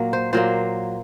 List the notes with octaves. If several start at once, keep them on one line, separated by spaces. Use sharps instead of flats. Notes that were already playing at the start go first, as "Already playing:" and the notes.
Already playing: A#2 F#3 A#3
C5
A#2 F#3 A#3 C5